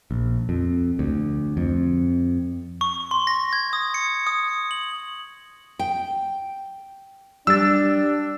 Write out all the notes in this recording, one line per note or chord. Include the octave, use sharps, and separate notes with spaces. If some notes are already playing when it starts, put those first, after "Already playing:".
A#1
F2
D2
F2
C#6
C6
A#6
G#6
D#6
C#7
D#6
F#7
G5
G3 D4 E6 A6